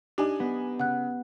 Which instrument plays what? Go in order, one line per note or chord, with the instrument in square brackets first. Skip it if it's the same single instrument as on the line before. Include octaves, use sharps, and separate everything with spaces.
[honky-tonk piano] D4 D#4 G#5 [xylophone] G4
[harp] B3
[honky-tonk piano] C#3 [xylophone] F#5 F#6